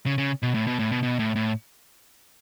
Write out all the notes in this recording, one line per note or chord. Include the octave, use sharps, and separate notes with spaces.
C#3
C#3
B2
A2
B2
A2
B2
B2
A2
A2